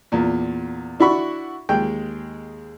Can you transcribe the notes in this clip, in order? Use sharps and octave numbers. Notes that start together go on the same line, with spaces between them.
E2 A#2
D4 E4 F#4 B5 C#6
D#2 G#3 G5